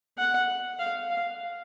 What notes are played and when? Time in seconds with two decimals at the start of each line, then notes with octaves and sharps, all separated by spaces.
0.18 F#5
0.79 F5
1.10 F5